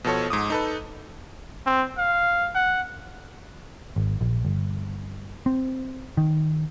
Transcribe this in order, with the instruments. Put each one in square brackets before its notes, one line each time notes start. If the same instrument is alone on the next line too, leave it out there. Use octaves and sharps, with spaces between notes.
[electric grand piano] B2 F3 A4 C#5
G#2 D6 D#6
D#4 A4 B4
[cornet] C4
F5
F#5
[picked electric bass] G#1
A#1
G1
C4
D#3